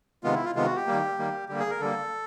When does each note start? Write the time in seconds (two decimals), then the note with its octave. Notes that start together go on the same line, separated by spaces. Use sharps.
0.24 C3 D#3 G#3 B3 F4
0.34 E4
0.45 F4
0.55 C3 D#3 G#3 B3 F4
0.66 F#4
0.76 G4
0.87 D#3 G3 A#3
1.18 D#3 G3 A#3
1.49 D3 G3 A#3 G4
1.60 G#4
1.70 A#4
1.80 D3 G3 A#3 A4